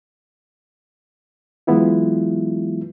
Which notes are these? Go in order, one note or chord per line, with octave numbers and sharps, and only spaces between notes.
E3 F#3 G#3 B3 E4 F4